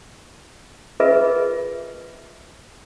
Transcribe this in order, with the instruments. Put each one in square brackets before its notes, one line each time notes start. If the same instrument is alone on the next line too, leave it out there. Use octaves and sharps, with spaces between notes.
[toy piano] F4 G#4 A#4 B4 D#5 E5